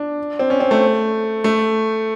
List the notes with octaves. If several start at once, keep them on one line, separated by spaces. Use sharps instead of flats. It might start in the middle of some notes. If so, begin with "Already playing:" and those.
Already playing: D4
C4
C#4
C4
A3
A3